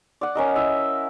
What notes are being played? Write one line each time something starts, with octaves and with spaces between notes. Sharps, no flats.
D5 F#5
C#4 A#4 D#5
E4 E5